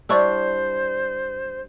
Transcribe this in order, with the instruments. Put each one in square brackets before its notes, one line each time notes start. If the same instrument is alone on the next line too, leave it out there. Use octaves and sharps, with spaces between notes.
[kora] G3 D4 E4 [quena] C5 [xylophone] D5 C#6 E6